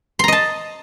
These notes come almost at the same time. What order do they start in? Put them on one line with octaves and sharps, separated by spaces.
C6 A#5 D#5 A5